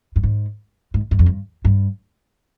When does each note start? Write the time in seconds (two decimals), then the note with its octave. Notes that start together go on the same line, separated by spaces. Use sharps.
0.16 G2
0.23 G#2
0.94 G#2
1.11 G2
1.19 F2
1.26 G2
1.65 G2